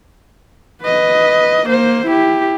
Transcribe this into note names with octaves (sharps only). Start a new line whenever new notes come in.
B4 D#5
A#3 C5
E4 G4